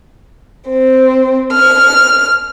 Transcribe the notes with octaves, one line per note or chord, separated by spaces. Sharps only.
C4
F6